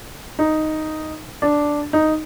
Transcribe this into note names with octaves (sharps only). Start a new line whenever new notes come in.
D#4
D4
D#4